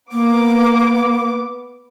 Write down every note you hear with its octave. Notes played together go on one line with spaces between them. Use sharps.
A#3 B3 D6